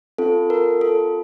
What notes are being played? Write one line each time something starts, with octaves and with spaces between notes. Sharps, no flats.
C4 F4 A4
A#4
A4